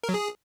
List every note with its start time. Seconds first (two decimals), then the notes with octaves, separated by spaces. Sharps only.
0.04 A#4
0.09 F#3
0.14 G#4